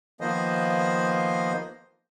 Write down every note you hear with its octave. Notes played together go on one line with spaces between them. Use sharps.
D#3 F3 A#3 B3 C5 D#5